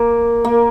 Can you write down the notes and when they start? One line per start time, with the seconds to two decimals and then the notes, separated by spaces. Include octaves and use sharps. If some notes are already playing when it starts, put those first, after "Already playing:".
Already playing: A#3
0.45 A#3